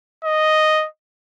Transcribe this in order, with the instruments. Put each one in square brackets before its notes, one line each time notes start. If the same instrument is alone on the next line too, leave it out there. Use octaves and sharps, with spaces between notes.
[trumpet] D#5